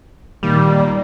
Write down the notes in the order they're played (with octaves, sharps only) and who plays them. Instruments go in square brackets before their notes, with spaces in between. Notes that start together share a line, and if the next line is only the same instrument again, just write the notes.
[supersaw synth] A#2 D#3 A#3 [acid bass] G3